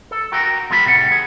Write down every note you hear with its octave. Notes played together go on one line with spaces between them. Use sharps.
A4
F#4 A#4 G5
B2 F3 G#3 F4 B4 B5
A2 C3 G3 F#5
D#2 G#4